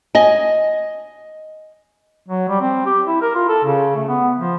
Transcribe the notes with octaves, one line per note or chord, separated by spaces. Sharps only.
D#5 G#5
F#3
G3
C4
G4
E4
A#4
F4
A4
C#3
A3
B3
F3